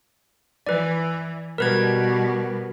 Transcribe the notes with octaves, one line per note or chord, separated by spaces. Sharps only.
E3 B4 D5
B2 G3 A#4 B4 G#6